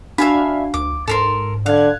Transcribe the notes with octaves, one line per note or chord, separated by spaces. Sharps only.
D4 F#4 E5 F5 G#5 B5
D2 D6
G#2 A4 A#4 C6
D3 F5 F#6 G#6